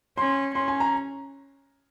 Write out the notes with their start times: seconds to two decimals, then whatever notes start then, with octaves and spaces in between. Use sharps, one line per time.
0.18 C#4 C6
0.55 C#4 C6
0.68 G#5
0.80 A#5